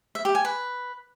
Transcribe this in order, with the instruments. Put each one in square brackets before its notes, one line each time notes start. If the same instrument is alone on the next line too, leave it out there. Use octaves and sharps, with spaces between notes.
[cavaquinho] E5
G4
G#5
B4